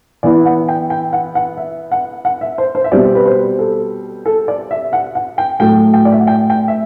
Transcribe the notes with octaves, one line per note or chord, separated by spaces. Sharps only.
E3 B3 E4 D5
F#5
G5
G5
F#5
F#5
E5
F#5
F#5
E5
C5
C5
E5
B2 G3 C4 D5
B4
C5
A4
A4
D5
E5
F#5
F#5
G5
A2 F#3 A3 G5
G5
D5
E5
F#5
G5
G5
E5